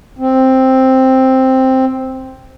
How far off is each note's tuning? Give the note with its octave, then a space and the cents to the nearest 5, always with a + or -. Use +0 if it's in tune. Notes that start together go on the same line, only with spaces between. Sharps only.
C4 +5